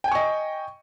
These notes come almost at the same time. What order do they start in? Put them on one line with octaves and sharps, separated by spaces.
G5 G#5 C#6 D#5